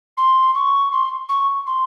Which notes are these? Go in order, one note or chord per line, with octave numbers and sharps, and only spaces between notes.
C6
C#6
C6
C#6
C6